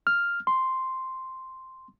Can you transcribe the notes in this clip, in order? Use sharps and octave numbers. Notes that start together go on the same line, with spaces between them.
F6
C6